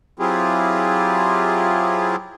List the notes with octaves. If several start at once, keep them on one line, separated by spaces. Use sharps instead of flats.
F#3 C4 E4 F4 G4 G#4